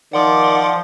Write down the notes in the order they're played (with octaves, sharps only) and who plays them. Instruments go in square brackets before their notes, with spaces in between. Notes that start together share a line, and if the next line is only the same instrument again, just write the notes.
[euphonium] D#3 [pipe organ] F3 [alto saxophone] D5 [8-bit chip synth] F#5 C6 D6